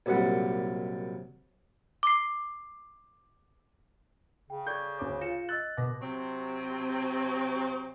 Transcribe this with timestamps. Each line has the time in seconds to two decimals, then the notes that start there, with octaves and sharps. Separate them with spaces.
0.06 A#1 F#2 C3 G3 F#5
2.03 D6 C7
4.50 C#3 G5
4.67 A4 D5 C#6 G6 G#6
4.99 D2 C#5 D6
5.21 F4 A#6 C#7 E7
5.49 D#5 E6 F#6 A6
5.77 B2 D6 A#6
6.00 C3 F#3 C4